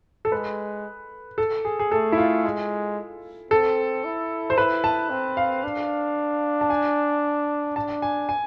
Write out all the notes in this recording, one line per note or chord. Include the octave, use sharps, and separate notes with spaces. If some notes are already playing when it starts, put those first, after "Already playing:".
A4
G#3 B4
A4
G#4
G#4
A3 A4
E4
F4
G#3
C4 A4
E4
C5
E4 B4
A5
C4
F5
D4
A5
G#5
D4 A5
G#5
G#5